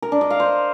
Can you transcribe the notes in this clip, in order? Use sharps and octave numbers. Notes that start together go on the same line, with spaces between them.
A#4
D4
D#5
F5
C5